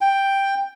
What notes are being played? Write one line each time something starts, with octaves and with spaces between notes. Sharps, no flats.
G5